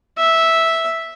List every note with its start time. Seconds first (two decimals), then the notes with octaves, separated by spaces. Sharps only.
0.18 E5